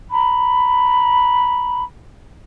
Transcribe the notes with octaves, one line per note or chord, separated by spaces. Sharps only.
A#5 B5